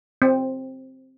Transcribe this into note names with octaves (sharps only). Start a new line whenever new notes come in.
C4